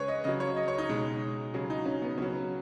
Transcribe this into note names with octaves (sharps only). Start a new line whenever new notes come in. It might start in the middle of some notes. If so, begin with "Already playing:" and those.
Already playing: C#3 G#3 G#4 B4 C#5
D#5
C#3 F#3 D#5
C#5
D#5
C#5
D#4
B2 G#3
C#3 F#3 G#4
D#4
C#4
B3
C#3 F#3 C#4